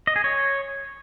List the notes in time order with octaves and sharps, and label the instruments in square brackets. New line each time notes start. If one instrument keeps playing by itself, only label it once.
[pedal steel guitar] D#5
G#4
C#5